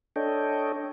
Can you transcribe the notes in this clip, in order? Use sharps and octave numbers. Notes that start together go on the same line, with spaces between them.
D4 A4 C#5 D#5 G5